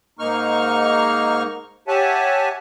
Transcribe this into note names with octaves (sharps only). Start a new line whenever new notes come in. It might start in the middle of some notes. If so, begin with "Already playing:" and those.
G#2 A#3 D#4 C#6 F6
G4 C#5 E5 F#5 G#5 A5